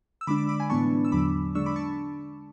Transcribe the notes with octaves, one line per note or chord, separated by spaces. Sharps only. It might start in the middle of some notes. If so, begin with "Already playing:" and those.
E6
D3 G#3 D4 B5 D6
B5 D6
B5 D6
G#5 B5
A2 E3 B3 D4 A5 C#6
E6
E2 D3 F#3 B5 D6
D3 G#3 D4 C#6 E6
B5 D6
A5 C#6